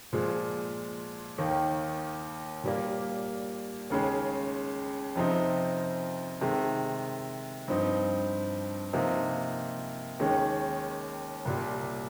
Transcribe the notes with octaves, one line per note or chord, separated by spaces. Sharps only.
A#2 F3 G#3
D#2 D#3 A#3
A#2 G3 A#3
D#2 C#3 G#3
F2 C3 F3 C4 D#4
C3 D#3 G#3
G2 F3 C4 D#4
C3 F3 A#3 D#4
D#2 D#3 G#3 C#4
C2 A#2 G3